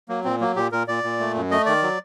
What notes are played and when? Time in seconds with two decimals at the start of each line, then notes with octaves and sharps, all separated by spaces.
0.09 F#3 A#3
0.24 A#2 C4
0.40 F#3 A#3
0.56 A#2 G4
0.72 A#2 A#4
0.87 A#2 D5
1.04 A#2
1.20 A3
1.35 F#2
1.51 A3 D#5
1.66 D#3 D5
1.83 F#3